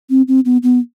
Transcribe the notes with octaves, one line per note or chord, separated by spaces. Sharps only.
C4
C4
B3
B3